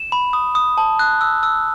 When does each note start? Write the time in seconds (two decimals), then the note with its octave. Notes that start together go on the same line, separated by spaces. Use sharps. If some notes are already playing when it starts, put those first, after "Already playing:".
Already playing: E7
0.12 B5
0.33 D#6
0.55 D#6
0.78 A5
0.99 F#6
1.21 E6
1.43 E6